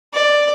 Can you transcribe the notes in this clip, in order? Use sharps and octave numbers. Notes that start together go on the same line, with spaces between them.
D5